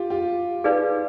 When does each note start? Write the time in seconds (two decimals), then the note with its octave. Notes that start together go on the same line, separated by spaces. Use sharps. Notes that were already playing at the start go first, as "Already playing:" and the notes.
Already playing: F4 G4
0.10 F4 G4
0.64 D#4 G#4 B4 D5 F5